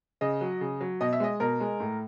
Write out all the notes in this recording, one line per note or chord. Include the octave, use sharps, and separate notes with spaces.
C#3 D#5
F#3
C#3
F#3
B2 D#5
E5
G#3 D#5
B2 A#4
G#3
A2